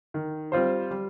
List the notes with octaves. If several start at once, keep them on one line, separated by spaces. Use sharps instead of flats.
D#3
G3 C4 F4 C5
G3